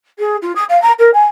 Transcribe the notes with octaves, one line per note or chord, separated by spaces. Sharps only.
G#4
F4
D#6
F5
A#5
A#4
G#5